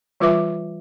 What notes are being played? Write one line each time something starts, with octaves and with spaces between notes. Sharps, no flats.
E3 G3 F4 B4 E5 D6